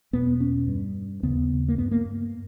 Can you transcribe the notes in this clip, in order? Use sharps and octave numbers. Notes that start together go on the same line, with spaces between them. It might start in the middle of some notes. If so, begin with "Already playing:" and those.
E2 B2 B3
C#4
G2
D#2 C#3 B3
A#3
G2 B3
A#3